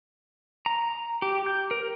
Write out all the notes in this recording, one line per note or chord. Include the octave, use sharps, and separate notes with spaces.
A#5
G4
G6
A#4